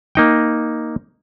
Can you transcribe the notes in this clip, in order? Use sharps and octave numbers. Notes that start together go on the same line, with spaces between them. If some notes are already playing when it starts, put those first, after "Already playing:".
A#3 D#4 G5